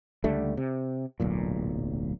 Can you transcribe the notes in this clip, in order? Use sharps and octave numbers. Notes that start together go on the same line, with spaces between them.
C#2 D3 G3 A3
C3
D1 B1 A#2